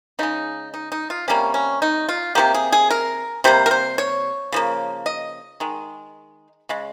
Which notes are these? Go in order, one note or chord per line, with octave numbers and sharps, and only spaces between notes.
C#3 G#3 D#4
D#4
D#4
F4
C3 G3 A#3 C#4
C#4
D#4
F4
C3 F3 A#3 G4
G#4
G#4
A#4
C3 G3 A#3 C5
A#4
C5
C#5
C#3 F3 A#3
D#5
D#3 G#3
C#3 G#3